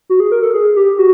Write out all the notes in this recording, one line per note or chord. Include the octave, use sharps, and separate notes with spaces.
F#4
G#4
A#4
A4
G#4
G4
F#4